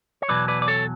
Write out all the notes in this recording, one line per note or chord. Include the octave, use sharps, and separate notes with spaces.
C#5
E2 B2 F#3 B4 D5
B4 D5
D5
A4 C#5